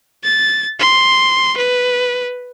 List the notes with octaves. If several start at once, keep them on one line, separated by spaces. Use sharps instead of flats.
A6
C6
B4